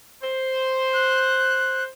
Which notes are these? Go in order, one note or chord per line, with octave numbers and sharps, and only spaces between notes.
C5
F#6